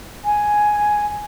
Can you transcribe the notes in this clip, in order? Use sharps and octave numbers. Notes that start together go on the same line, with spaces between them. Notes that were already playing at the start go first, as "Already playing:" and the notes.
G#5